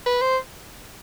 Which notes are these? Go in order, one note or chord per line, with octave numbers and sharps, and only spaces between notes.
B4
C5